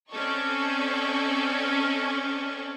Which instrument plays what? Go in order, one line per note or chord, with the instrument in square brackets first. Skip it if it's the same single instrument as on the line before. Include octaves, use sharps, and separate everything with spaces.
[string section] C4 C#4 A4 D5 D#5 C#6